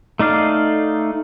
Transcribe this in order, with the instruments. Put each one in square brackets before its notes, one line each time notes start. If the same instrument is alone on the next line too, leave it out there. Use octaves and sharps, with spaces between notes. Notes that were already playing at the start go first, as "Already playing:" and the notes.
[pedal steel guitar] A3 D#4 D5 F5